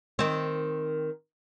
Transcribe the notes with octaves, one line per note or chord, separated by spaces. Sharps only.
D#3 C4